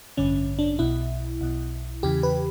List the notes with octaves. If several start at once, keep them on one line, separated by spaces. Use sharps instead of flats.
A1 G2 D3 C#4
D4
B1 B2 E4
B1 B2
E2 C#3 E3 G4
B4